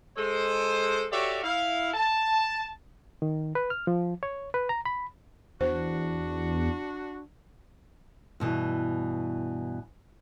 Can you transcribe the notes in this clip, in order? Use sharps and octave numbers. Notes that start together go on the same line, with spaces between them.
G#3 A4 C5
F#4 G4 A4 C#5 D5 E5
E4 F5
A5
D#3
B4
F6
F3
C#5
B4
A#5
B5
E2 D4 F#4 C5
G2 B2 E3